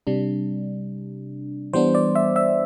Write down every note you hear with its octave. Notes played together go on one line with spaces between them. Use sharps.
C3 G3 D4
E3 G3 B3 D4 C5
D5
E5
E5